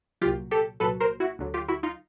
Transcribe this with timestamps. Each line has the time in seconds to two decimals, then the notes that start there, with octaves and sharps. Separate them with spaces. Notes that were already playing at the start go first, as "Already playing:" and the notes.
0.21 C2 A#2 F#3 F4 G4
0.51 G4 A4
0.80 C2 A#2 F#3 A4 B4
1.00 A#4 C5
1.20 E4 F#4
1.39 D2 D3 F#3
1.54 F4 G4
1.68 E4 F#4
1.83 D#4 F4